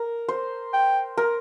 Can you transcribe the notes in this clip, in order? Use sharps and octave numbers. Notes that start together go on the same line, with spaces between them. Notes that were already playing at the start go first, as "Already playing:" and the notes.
Already playing: A#4
C5
G5
A#4